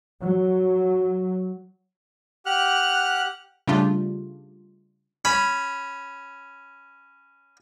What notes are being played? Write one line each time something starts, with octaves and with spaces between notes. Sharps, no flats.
F#3
G4 F#5 F6 F#6
C#3 G3 A3 D4 F4 G4
C#4 B5